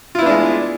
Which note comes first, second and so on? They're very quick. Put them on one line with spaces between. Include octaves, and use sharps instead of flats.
F4 E4 B3 D4 G#3